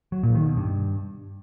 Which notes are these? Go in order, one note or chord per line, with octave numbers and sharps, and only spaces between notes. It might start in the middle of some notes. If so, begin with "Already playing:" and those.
F#3
A#2
D#3
B2
G2